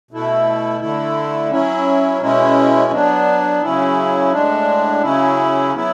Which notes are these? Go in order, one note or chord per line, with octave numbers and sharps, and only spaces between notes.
B2 A3 E4
D3 A3 E4
F#3 C#4 E4
B2 G#3 C#4 E4
F#3 B3 D4
C#3 F#3 C#4 E4
A2 G#3 D4
C#3 F#3 C#4 E4
F#3 B3 E4